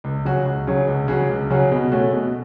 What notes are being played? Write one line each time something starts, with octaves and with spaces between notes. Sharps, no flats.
C#2
C#3 F#3 C#4 F#4
C#2
C#3 F#3 C#4 F#4
C#2
C#3 F#3 C#4 F#4
C#2
C#3 F#3 C#4 F#4
B2
A3 C#4 F#4
B2